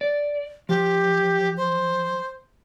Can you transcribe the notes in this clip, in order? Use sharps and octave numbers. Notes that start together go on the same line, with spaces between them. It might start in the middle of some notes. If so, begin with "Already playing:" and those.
D5
F3 G4
C5